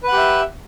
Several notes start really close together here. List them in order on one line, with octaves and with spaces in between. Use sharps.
B4 F#5 G4 E5